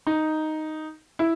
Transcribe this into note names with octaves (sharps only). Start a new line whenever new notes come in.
D#4
E4